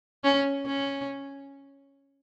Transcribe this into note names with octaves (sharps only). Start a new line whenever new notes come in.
C#4
C#4